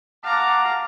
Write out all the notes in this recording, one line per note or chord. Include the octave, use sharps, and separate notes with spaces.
F5 F#5 A5 A#5 D6